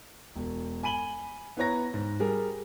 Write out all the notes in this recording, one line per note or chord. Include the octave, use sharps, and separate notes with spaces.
E1
G#5 B5 D#7 F#7 G7
B3 E4 B4 C#5 A#5 A#6
G#2
G3 G#4 A#4